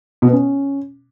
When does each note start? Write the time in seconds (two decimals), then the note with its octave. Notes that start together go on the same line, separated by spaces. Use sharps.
0.22 B2
0.27 B3
0.33 C#4